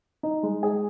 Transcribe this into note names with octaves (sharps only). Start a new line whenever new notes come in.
D#4
G#3
G#4